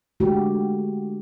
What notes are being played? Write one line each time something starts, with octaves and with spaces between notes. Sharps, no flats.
D3 G#3 A3 F#4 G4